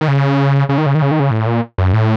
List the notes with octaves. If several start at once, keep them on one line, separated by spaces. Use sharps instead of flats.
D#3
C#3
C#3
D#3
C#3
D#3
C#3
D#3
C#3
A2
A#2
F#2
A2